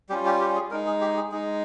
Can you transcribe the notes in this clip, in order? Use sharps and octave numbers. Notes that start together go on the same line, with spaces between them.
G3 C#4 F4 G4
G4
G4
G#4
G#3 D#4 A#4
G#4
G4
G#4
G#3 D#4 G#4